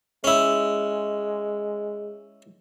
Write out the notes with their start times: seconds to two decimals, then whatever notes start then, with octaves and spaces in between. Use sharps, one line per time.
0.24 G#3 C#4 E4